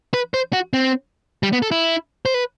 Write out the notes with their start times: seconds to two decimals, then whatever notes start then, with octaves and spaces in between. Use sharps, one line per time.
0.14 B4
0.34 C5
0.53 F#4
0.73 C4
1.43 G3
1.53 B3
1.62 A4
1.71 E4
2.26 C5
2.34 B4